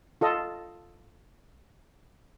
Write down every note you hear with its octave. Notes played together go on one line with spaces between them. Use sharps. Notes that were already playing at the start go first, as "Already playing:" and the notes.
F4 A4 D#5